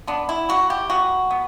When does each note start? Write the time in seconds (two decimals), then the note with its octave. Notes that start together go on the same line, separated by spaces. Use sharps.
0.07 B3 D4
0.29 E4
0.49 E3 F#4
0.70 G4
0.90 B3 F#4
1.31 B3